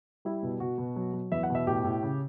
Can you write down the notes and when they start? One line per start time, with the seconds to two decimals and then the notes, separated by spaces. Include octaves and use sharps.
0.25 G3 E4
0.43 B2
0.60 B2 F#4
0.78 B2
0.96 F#3
1.13 F#3
1.32 E2 E5
1.43 F#5
1.50 B2 E5
1.66 A2 G4
1.84 A2
2.03 C#3